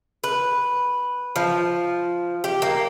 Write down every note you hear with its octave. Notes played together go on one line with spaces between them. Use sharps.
B4
F3
G4
A#3